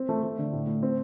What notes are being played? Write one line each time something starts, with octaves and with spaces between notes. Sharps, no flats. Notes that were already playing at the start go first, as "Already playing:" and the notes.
Already playing: C4
A3
A3
D3
A2
A2
C4